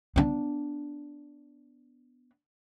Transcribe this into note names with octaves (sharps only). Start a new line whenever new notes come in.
B3 D4